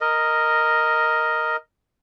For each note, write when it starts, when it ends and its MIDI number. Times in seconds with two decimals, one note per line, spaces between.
0.01 1.56 70
0.01 1.56 75